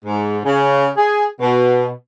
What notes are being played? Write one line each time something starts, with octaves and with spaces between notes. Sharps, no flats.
G#2
C#3
G#4
B2